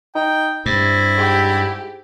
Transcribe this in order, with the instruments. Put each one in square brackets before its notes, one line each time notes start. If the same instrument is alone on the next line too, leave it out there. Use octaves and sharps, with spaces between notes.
[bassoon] D#4 [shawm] G5
[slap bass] G2 [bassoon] C3 [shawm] E4
[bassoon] G#2 [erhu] G4